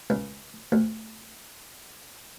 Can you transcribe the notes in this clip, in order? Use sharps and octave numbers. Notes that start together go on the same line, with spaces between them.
C#2
D2